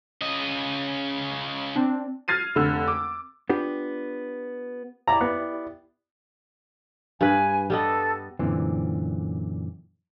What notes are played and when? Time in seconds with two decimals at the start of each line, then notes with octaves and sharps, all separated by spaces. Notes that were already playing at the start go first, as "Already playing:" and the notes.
0.21 C#3 D#5
1.76 C4 D4
2.28 F6 G#6 A6 C7 D#7
2.55 F1 D3 E6
2.88 D6
3.50 B3 D4 F4 G4
5.07 E4 G4 D5 A#5
5.21 B3
7.21 G2 B4 G#5
7.70 G3 B3 A4 D#5
8.39 F#2 A#2 D3 E3 C4